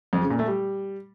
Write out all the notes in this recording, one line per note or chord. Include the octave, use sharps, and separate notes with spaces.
F2
C#3
A#2
A3
G3